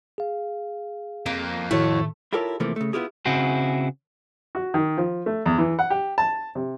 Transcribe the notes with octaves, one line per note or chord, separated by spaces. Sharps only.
G#4 F5
F2 A#3
A2 D#3 A3 E4 F#4 C#5
E4 F4 G4 A4 A#4 C#5
C3 E3 F3 A3 A#3 C4
C#3 A3
B3 E4 F4 G4 G#4
C#3 C4 E4 F#4 G#4
F#4
D#3
F3
A3
E2
E3
F#5
G4
A5
C3